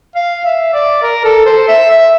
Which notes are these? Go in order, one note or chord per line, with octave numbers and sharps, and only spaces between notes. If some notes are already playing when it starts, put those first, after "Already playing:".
F5
E5
D5
A#4
A4
C5
E5
E5